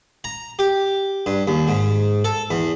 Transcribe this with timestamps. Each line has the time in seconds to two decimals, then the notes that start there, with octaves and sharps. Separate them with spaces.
0.24 A#5
0.59 G4
1.26 G2
1.48 D#2
1.68 G#2
2.24 A4
2.51 E2